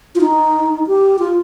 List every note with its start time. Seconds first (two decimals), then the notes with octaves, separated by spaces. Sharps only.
0.15 F4
0.21 D#4
0.87 G4
1.19 F4